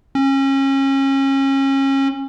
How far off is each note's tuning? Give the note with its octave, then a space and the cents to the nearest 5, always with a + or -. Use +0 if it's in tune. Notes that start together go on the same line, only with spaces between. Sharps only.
C#4 -30